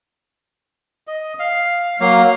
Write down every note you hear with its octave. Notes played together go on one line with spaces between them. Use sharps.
D#5
F5
F#3 A#3 F5